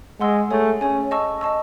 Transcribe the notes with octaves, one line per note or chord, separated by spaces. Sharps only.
G#3 F#5 C6 E6
A3 G#4 C#5 G#5
C#4 G#4 C#5 G#5
D#5 A5 C#6 E6
D#5 A5 C#6 E6